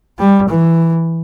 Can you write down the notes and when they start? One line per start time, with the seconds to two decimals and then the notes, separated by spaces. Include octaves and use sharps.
0.19 G3
0.49 E3